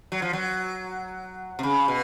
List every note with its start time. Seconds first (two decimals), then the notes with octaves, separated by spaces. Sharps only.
0.12 F#3
0.22 F3
0.33 F#3
1.59 C3
1.63 C#3
1.88 B2